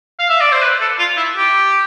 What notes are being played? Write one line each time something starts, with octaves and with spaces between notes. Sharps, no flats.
F5
E5
D5
C5
B4
A4
F4
E4
G4